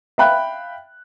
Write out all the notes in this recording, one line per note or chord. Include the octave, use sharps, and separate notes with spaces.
E5 F5 G5 B5 F#6